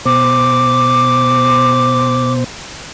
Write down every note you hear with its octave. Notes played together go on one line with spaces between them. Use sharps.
B2 C5 D6